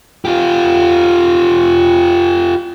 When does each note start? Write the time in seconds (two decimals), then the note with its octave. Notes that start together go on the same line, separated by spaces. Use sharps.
0.25 F4 G4